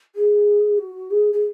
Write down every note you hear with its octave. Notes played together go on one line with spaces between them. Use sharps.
G#4
F#4
G#4
G#4